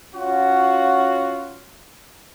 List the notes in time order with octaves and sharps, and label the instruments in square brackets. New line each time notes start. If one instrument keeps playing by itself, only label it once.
[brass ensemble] C#4 F4 F#4